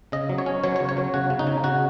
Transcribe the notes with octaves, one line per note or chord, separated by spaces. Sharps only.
C#3 D#5
F#3
C#5
C#4
F#3 C#5
C#5
C#3
C#5
F#3
C#3 F#4
C#3
D#4
C#3
C#3 F#4